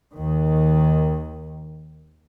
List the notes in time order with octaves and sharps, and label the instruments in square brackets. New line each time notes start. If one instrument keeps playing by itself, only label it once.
[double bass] D#2 D#3